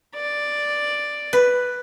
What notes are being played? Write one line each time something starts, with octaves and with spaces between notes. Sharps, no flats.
D5
B4